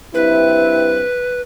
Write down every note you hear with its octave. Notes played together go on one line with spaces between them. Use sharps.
G2 C4 E4 B4